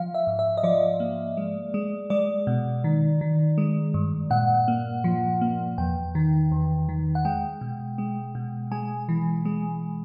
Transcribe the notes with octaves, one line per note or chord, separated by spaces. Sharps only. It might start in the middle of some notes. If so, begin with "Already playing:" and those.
Already playing: F3 F5
E5
G#2
E5
D#5
F3 D5
A#3
G#3
G#3
G#3 D5
B2
D#3
D#3
G#3
G2
A#2 F#5
A#3
F3
A#3
E2 G5
D#3
E2
D#3
F#5
G#3 G5
B2
G#3
B2
G#3 G#5
E3
G#3